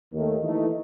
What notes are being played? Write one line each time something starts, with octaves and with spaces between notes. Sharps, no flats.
D#2 D#3 A3
E3 A3 D#4